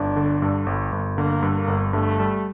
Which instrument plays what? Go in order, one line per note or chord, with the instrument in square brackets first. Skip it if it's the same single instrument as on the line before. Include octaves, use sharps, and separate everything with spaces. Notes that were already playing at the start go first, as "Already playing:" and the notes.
Already playing: [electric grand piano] G1 [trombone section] D4
[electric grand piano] D3
G2
G1
G1
[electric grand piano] D3 [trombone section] A#3
[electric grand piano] G2
[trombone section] A#3
[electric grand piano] G1
[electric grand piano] G2 [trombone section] A3
[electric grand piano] G3